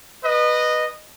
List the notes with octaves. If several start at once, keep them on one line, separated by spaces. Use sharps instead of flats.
B4 D#5